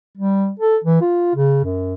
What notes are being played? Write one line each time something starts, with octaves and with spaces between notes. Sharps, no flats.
G3
A4
E3
F4
C#3
F#2